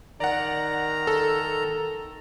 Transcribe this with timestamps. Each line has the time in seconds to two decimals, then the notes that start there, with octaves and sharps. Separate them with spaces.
0.20 D#3 D5 F#5 A#5
1.07 A4